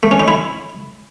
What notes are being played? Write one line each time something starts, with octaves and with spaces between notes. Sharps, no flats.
A3
C#4
D#4
E4